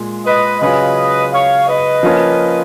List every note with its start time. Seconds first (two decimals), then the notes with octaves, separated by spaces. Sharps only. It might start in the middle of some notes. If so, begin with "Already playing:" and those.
Already playing: A#2 G#3
0.25 B4 D#5
0.61 C#3 F#3 C#4 F4 G#4 B4 D#5
1.32 C#5 F5
1.67 B4 D#5
2.03 F3 A#3 C#4 F4